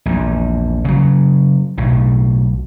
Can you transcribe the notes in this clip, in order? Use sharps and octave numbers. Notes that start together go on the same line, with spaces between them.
A#1 E2
C#3 F#3
B1 A2